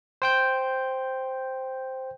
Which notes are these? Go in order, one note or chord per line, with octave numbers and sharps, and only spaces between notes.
C5 G5 G6